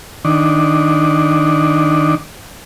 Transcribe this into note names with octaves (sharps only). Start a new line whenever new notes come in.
D#3 D4